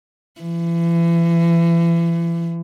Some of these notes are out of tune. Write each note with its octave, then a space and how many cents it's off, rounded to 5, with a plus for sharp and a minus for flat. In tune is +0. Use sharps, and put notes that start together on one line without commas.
E3 +35